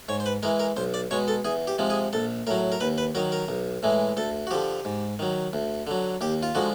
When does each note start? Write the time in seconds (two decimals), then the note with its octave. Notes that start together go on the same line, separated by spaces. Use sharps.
0.09 G#2 C#5
0.20 C5
0.26 B4
0.43 E3 G#3 A#4
0.59 A#4
0.77 B1 C5
0.94 D5
1.11 B2 G#3 C#5
1.28 A4
1.45 E2 G#4
1.67 G4
1.78 C3 F3 G#3
1.90 G#4
2.13 A#1 A4
2.47 A2 F#3 A#4
2.72 A#4
2.81 D#2 B4
2.98 B4
3.15 D#3 F#3 A#4
3.32 A#4
3.48 B1
3.83 A2 E3 G#3
4.17 D2 A4
4.47 F#4
4.51 D3 F3 G4
4.85 G#2
5.19 D#3 F#3
5.53 D2
5.87 D3 F#3
6.21 D#2 G4
6.43 F4
6.55 D3 F3 G#3 F#4